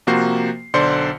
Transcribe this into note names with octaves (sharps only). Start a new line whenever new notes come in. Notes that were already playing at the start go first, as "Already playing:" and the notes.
C3 F3 A#3 F#4 C5 C7
B1 D3 C5 D5 C6 C#7